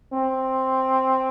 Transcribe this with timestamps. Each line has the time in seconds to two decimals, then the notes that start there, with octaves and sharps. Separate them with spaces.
0.13 C4